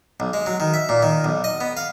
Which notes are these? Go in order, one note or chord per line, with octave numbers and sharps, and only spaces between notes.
B1
G#3
F#3
D#3
E5
A#2
D#3
B1
D#5
B3
F5